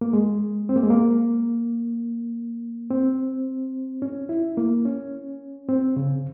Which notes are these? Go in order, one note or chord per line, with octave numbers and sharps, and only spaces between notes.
A#3
G#3
C4
A#3
G#3
A#3
C4
C#4
E4
A#3
C#4
C4
C#3